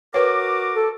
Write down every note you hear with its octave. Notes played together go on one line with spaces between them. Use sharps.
F#4 A#4 B4 C#5 D6
A4